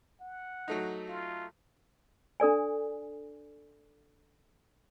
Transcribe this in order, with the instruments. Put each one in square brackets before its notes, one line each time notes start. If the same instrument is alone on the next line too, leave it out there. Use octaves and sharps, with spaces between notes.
[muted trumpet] F#5
[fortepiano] F#3 A3 D#4
[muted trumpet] F4
[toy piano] D4 A4 D5 G#5